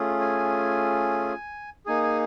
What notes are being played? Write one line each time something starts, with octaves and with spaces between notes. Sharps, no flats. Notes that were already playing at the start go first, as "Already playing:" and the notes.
Already playing: A3 C#4 F4 G#4
G#5
A#3 D#4 G#4 G#5
G#5